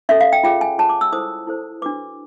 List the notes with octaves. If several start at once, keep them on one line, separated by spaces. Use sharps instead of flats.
C#4 F#4 A4 E5
F5
G5
F4 G#4 C#5 G5
G#5
F4 G#4 C#5 A5
D6
E6
E4 A4 C5 D#6
E4 A4 C5
D4 F#4 B4 D6